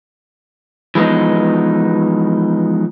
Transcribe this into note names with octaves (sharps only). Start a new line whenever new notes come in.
E3 F3 G#3 B3 D#4